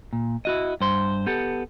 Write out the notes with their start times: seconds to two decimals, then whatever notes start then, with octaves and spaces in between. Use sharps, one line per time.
0.13 A#2
0.45 E4 F#4 D#5
0.81 G2 C5 C6
1.26 B3 G4 A4